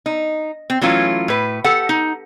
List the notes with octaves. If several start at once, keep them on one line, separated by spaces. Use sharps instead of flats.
D#4
C4
E3 F#3 A3 C#4 F4
A2 B4
G4 A4 F#5
D#4